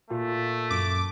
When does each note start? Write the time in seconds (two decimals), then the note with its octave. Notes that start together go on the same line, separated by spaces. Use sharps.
0.10 A#2 A3 F4
0.71 F#2 D6